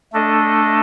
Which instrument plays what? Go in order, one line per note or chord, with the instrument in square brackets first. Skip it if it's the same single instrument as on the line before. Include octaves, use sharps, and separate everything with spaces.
[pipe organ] A3 D4 A4 D#5